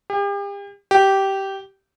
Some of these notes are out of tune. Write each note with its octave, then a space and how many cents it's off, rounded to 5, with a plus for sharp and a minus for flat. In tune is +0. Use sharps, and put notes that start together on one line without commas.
G4 +40
G4 -15